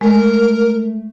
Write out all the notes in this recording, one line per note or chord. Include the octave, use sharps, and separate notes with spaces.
G#3 A3 A#4